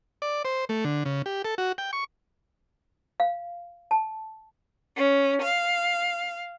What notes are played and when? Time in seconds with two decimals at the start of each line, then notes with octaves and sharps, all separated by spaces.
0.22 D5
0.45 C5
0.69 A3
0.84 D3
1.05 C#3
1.26 G4
1.45 A4
1.58 F#4
1.78 G5
1.93 C#6
3.20 F5
3.91 A5
4.96 C#4
5.42 F5